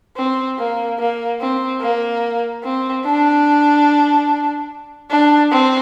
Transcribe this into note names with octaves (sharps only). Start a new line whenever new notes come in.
C4
A#3
A#3
C4
A#3
C4
D4
D4
C4